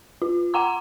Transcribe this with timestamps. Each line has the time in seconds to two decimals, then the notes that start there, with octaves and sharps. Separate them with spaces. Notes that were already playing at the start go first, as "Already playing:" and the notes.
0.22 F4
0.54 F#5 G5 A#5 D6